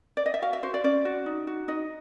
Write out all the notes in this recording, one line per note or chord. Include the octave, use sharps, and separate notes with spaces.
D5
D#5
E5
F#4 F5
E5
F#4 C5
D5
C#4 D5
F#4
D#4
F#4
D#4 D#5